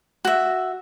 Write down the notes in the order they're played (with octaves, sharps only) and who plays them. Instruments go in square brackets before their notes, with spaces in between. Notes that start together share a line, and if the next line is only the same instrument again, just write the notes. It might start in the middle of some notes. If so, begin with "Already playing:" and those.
[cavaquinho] F#4 E5